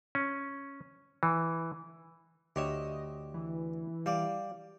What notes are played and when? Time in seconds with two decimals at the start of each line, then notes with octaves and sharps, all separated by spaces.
0.15 C#4
1.23 E3
2.56 D2 G4 C#5 D#5 E5
3.34 E3
4.06 G3 D5 F5